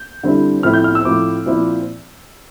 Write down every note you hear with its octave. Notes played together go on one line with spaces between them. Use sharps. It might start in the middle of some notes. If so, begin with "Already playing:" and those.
Already playing: G6
D3 G3 C4 E4
A2 F3 C4 E4 F6
G6
F6
E6
A2 F3 C4 E4 D6
A#2 F3 C4 E4